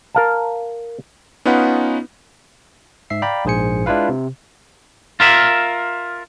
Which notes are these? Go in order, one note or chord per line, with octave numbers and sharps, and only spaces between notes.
A#4 F5 A5
B3 C#4 D#4 F4 B4 F#5
G#2 E5 C7
D5 F5 G5 A#5 B5
A#1 G#2 G#4 C5 G#5 C#7
G#3 D4 E4 F4 B4 F5
C3
F4 A#4 E5